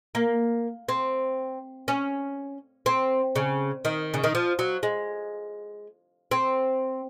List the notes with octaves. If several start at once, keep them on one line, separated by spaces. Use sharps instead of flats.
A#3
C4
C#4
C4
C#3
D#3
C#3
D#3
F3
F#3
G#3
C4